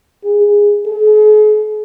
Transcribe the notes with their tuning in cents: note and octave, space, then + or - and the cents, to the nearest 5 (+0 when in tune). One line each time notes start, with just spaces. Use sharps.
G#4 -10
G#4 +45